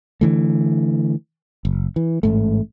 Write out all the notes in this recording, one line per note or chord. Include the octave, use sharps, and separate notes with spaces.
D3 E3 A3
F#1
E3
A1 G#2 A3